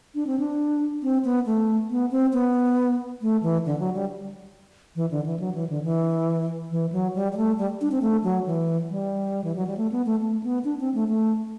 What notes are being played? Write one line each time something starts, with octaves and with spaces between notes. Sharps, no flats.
D4
C4
D4
C4
B3
A3
B3
C4
B3
A3
E3
D3
F#3
G3
E3
D3
E3
F#3
E3
D3
E3
E3
F#3
G3
G3
A3
G3
D4
C4
A3
F#3
E3
G3
E3
F#3
G3
A3
B3
A3
A3
B3
D4
C4
A3
A3